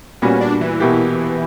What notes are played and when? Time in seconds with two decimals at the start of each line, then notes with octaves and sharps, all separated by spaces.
0.22 A#2 G3 B3 C#4 F#4
0.41 D4
0.61 E3
0.80 B2 A#3 E4 G4